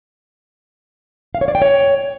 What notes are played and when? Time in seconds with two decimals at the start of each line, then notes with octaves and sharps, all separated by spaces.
1.35 F5
1.41 C#5
1.48 D5
1.55 G5
1.62 C#5